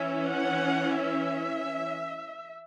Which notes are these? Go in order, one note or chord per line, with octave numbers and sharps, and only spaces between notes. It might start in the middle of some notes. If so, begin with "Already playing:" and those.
Already playing: E3 C#4 E5
F#5
E5